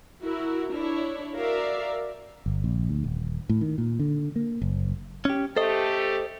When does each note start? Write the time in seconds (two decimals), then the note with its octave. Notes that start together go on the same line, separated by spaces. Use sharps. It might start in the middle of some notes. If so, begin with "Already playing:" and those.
0.23 E4 F#4 A#4
0.73 D4 E4 C#5
1.36 F#4 A#4 D5 E5 F5
2.46 G1
2.64 A#1
2.89 D2
3.04 D#1
3.49 A2
3.61 D#3
3.78 A#2
4.00 D3
4.36 A#3
4.62 F#1
5.25 C#4 G4
5.57 A3 G4 A4 C5 D#5